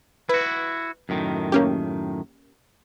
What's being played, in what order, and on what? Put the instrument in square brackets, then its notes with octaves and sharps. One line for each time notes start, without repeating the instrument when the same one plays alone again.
[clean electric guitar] E4 F#4 [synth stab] B4
[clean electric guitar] F#2 A2 D#3
[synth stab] A#3 C#4 G4